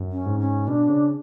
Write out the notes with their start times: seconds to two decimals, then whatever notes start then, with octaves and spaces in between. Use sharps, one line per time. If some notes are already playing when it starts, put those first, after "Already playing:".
Already playing: F#2
0.12 C#4
0.26 G#2
0.40 C#4
0.68 B2 D4
0.89 C#3